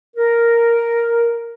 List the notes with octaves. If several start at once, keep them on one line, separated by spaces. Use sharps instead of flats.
A#4